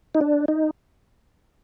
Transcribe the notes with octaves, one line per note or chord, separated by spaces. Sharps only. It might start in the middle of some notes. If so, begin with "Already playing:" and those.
D#4
D4
D#4